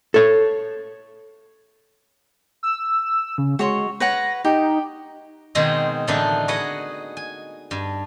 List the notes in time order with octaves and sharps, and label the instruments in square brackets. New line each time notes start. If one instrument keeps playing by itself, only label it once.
[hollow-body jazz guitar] A4 C#5
[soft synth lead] E6
C#3
[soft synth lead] G#3 [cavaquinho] F#4 C#5 C6
[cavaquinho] B4 C#5 F#5 [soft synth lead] A#6
[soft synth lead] D#4 [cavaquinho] G4
[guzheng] B2 D#3 G#3 C4 G#4
A2 D3 E3 B3 D4 D#4
F#4 G#4 B4 D#5 F#5
G#5
G2